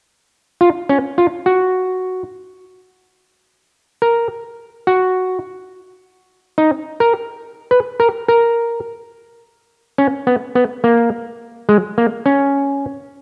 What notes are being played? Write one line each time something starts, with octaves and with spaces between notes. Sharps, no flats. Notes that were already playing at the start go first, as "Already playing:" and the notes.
F4
C#4
F4
F#4
A#4
F#4
D#4
A#4
B4
A#4
A#4
C#4
B3
B3
A#3
G#3
A#3
C#4